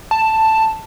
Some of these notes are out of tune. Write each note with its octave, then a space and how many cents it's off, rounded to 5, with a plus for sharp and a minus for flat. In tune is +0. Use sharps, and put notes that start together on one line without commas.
A5 +5